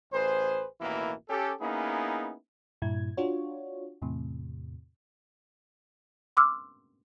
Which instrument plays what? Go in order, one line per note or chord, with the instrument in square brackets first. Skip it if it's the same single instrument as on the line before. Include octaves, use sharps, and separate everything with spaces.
[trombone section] A1 G#4 B4 C5
A1 D#2 B2 E3 A#3 E4
C#4 G4 A4
A#3 B3 C#4 D#4 E4 G#4
[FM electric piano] G2 A#2 E4 G#6
D4 F4 F#4 C#5
E2 A2 C3
[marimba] C6 D6 E6 F6